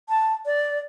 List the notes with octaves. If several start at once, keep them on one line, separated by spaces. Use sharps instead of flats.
A5
D5